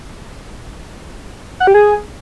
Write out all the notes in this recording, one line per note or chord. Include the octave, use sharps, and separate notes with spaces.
F#5
G4
G#4